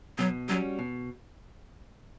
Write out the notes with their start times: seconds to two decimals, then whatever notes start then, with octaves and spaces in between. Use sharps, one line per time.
0.18 B2 F#3
0.48 F#3 G3 C#4 F#4
0.79 B2